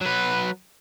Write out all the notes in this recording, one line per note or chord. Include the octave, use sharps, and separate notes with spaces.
F#3 B4